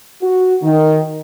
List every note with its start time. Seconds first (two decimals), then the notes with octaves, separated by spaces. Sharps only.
0.23 F#4
0.63 D#3